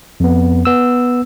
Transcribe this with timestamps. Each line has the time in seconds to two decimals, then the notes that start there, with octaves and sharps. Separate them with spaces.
0.20 F2 B3
0.65 B3 E6